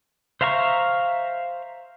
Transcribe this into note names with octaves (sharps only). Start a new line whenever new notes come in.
C5 E5 F5 A#5 C#6